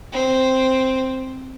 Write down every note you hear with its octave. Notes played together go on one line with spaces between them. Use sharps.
C4